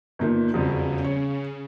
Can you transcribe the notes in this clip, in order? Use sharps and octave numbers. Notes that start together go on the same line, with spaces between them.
G1 A#2 D#3
E1 F2 C#3 G3
C#5